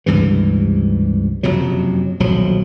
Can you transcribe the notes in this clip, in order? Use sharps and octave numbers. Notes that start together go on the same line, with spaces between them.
C#2 G2 C3 E3
F#1 F2 C3 F#3
D#1 B1 F3 F#3